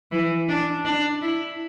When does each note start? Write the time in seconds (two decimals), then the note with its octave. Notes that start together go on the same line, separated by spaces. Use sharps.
0.12 E3
0.49 D4
0.85 D4
1.22 E4